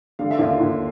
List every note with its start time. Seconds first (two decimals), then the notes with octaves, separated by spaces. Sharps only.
0.19 D3 F5
0.31 E5
0.39 D#2 F4 F5
0.60 D#2